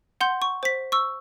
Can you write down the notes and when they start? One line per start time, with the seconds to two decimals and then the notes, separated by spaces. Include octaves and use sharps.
0.21 F#5 C6 G6
0.42 C#6
0.63 C5 B6
0.92 C#6 E6